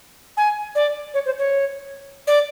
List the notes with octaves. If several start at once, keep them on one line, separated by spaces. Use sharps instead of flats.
G#5
D5
C#5
C5
C#5
D5